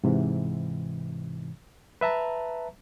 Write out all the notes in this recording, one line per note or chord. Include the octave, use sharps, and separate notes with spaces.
G#2 C3 E3
B4 E5 A5 A#5